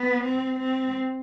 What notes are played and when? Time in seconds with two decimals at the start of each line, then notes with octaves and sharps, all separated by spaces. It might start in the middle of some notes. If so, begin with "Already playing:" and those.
Already playing: B3
0.23 C4
0.59 C4